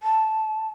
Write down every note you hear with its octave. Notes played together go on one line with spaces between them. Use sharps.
A5